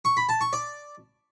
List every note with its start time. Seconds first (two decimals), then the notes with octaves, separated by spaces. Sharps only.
0.05 C#6
0.17 B5
0.29 A5
0.41 C#6
0.53 D5